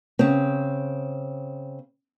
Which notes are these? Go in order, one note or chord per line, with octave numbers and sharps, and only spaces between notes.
C#3 C4